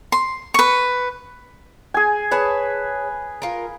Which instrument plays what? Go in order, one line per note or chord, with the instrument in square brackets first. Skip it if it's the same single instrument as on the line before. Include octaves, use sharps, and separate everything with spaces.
[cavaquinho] C6
B4 C#6
[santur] G#4 G#5
[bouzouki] G#4 C#5 A5 [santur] B4
[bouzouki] F4 A#4